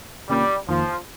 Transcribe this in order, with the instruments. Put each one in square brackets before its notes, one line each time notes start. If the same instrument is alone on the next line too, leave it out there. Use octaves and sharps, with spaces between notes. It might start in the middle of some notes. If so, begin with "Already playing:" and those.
[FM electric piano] C3 D#3 A#3 C#4 F4 [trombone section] G3
[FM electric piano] F2 D#3 A#3 F4 [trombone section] F3